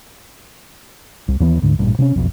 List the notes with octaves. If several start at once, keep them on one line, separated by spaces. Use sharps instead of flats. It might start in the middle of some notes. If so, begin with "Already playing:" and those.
C2
D#2 E3 B3
D2 G#2 D3
A1 G2 A#2
C3 B3 C#4
F#1 B1 F2